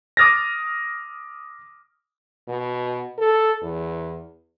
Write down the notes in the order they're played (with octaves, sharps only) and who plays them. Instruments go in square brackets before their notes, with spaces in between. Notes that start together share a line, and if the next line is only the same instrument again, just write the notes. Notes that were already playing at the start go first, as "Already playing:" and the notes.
[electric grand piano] D6 D#6 F6 A6 A#6
[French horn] B2
A4
E2